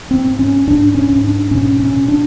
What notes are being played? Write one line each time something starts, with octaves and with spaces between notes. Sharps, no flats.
C4
G#2
C#4
G#2 D4
C#4
G#2
D4
B2 C#4
C#4
B2
D4